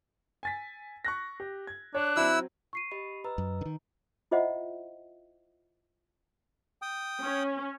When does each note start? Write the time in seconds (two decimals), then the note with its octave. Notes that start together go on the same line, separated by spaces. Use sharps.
0.43 G#5 A6 B6
1.05 C#6 F#6 A#6
1.40 G4
1.67 G#6
1.95 D4 C#5 F#6
2.17 F#3 C4 E4 E6
2.73 C#6 C7 D#7
2.91 G4 D#5 B5
3.24 B4 D#5 A#5 E6
3.38 F#2
3.61 D3 D#3
4.31 E4 F4 C5 D#5 E5 F#5
6.82 G5 D#6
7.23 C#4